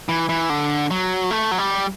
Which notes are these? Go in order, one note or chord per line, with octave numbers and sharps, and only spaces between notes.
E3
E3
D3
F#3
A3
F#3
G3